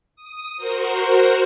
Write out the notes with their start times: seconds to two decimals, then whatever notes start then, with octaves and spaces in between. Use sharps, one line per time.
0.16 D#6
0.57 F#4 A#4 C5